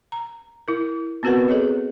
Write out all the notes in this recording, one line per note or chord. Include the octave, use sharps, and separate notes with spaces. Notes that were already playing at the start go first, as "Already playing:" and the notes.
A#5
E4 A#4
B3 C4 F#4 A#4 B4 F#5
G#4 A4 C#5 D#5